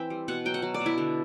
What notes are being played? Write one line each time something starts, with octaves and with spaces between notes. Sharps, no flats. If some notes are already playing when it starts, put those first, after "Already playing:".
Already playing: E3 C4 E5 G5
G3
B2 F#5
F#3 G5
F#5
F#3
D5
B2
E4
D3